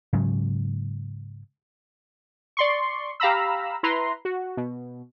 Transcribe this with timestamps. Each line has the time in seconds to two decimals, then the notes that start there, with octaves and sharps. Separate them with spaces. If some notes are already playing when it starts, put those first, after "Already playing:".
0.13 G#2 C#3 F#3
2.57 D5 C6 C#6
3.20 G4 F5 A#5 B5 E6
3.83 E4 B4 A#5 C6
4.25 F#4
4.57 B2